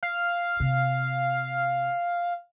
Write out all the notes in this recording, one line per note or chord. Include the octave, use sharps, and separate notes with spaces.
F5
C3